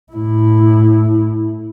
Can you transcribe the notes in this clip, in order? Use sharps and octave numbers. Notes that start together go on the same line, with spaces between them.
A2 E4